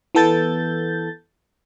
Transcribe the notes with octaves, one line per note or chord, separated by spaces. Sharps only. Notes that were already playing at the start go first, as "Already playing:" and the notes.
E3 B3 A4 G6 A6